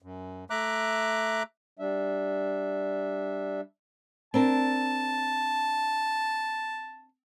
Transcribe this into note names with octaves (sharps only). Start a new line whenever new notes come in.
F#2
A3 E5 A#5 D6 F#6
G3 D4 E5
C4 D4 A#4 A5